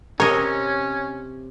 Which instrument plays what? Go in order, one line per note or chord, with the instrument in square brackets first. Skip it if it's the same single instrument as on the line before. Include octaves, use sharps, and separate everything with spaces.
[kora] C3 C5 [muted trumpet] C#4 [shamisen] A#4 [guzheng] C#5 D#5